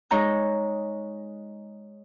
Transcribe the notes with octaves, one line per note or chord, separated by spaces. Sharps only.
G#3 D#4 C#5 A#5 G6